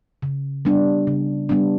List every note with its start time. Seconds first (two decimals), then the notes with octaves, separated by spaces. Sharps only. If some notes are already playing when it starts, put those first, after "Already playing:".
0.22 C#3
0.65 G3 B3 D4
1.07 C#3
1.49 G3 B3 D4